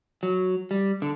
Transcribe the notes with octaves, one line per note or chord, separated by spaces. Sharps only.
F#3
G3
D3